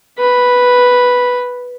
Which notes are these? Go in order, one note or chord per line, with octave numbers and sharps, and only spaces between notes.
B4 B5